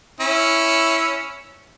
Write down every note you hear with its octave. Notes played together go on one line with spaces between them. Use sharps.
C#4 E4 E6